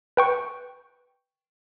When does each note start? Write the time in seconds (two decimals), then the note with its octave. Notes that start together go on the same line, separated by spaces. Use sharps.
0.17 B4 G5 C#6